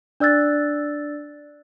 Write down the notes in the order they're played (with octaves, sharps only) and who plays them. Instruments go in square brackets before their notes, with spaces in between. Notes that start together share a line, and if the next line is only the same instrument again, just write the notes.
[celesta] D4 D5 E6 F#6 A6